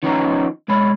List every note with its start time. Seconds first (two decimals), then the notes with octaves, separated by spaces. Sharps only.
0.03 D#3 F3 B3 C#4 D#4 A#5
0.68 B1 G#3 C#5 B5